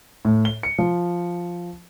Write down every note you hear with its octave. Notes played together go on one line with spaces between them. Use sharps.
A2
G7
C#7
F3